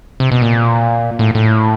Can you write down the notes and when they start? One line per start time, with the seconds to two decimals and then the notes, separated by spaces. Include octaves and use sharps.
0.20 C3
0.32 B2
0.42 A#2
1.19 A2
1.35 A2